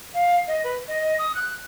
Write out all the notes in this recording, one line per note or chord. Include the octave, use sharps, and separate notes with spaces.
F5
D#5
B4
D#5
D#6
F#6